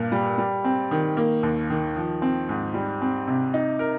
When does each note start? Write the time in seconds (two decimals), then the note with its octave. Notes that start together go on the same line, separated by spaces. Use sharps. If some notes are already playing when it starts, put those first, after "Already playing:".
Already playing: G2 A#2
0.12 G3
0.38 G3
0.64 C4
0.91 D#3
1.17 A#3
1.43 D#2
1.70 D#3
1.96 F3
2.22 C4
2.49 G#2
2.74 G3
3.02 C4
3.27 C3
3.54 D#4
3.79 A#4